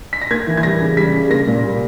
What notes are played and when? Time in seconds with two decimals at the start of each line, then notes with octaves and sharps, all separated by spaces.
0.13 B6
0.22 A#6
0.31 A#3 G#6
0.47 E3
0.57 G#6
0.63 G3 A#6
0.81 C#3
0.97 G3 B6
1.13 C#3
1.30 A#3 A#6
1.47 A#2
1.63 G3